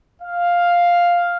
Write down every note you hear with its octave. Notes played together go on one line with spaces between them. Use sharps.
F5